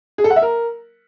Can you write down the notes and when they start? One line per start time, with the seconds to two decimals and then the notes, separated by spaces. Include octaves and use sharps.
0.18 G#4
0.24 A4
0.30 F#5
0.36 E5
0.42 A#4